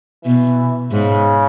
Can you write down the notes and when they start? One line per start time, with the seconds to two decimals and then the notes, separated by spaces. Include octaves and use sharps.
0.24 B2 E3
0.92 G#2 C#3